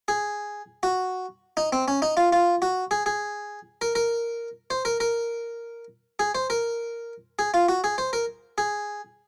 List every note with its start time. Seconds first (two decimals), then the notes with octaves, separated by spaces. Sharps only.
0.08 G#4
0.83 F#4
1.57 D#4
1.73 C4
1.88 C#4
2.02 D#4
2.17 F4
2.32 F4
2.62 F#4
2.91 G#4
3.06 G#4
3.81 A#4
3.95 A#4
4.70 C5
4.85 A#4
5.00 A#4
6.19 G#4
6.35 C5
6.50 A#4
7.39 G#4
7.54 F4
7.69 F#4
7.84 G#4
7.98 C5
8.13 A#4
8.58 G#4